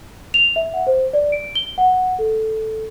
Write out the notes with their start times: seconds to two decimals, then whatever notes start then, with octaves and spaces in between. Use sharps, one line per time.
0.34 F7
0.56 E5
0.73 F#5
0.87 C5
1.13 D5
1.32 D7
1.55 G7
1.78 F#5
2.19 A4